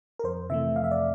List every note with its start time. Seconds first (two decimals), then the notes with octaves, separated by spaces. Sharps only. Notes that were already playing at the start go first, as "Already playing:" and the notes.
0.19 A#4
0.24 F2 C5
0.49 C3 E3 A3 E5
0.76 F2 F5
0.84 E5
0.91 D5